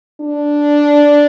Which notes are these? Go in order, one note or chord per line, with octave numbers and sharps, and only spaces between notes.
D4